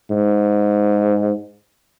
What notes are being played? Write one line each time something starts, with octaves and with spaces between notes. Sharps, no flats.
G#2